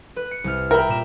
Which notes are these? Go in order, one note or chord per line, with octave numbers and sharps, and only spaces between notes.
B4
C#7
C2 F6
A#4 E5 G5 B5
A#2 E7